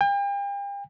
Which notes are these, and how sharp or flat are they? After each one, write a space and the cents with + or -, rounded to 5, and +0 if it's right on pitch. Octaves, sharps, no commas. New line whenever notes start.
G5 +40